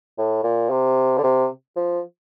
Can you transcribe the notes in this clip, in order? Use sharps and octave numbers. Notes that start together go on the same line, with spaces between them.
A2
A#2
C3
D3
C3
F3